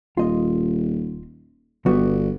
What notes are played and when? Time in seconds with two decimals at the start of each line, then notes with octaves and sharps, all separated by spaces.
0.17 D#1 F4 D#5
1.86 G1 G3 B3 F#4